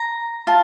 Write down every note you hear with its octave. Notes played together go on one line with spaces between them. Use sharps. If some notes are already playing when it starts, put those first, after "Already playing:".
Already playing: A#5
F4 A5